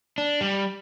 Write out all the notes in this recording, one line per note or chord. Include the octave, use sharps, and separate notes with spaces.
D4
G3